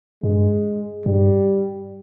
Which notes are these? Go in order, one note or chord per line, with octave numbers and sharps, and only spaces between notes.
G2 G#3
G2 G3